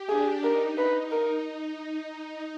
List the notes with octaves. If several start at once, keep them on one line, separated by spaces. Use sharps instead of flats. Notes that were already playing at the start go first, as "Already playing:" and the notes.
Already playing: G4
D4 G#4
D#4 A#4
D#4 B4
A#4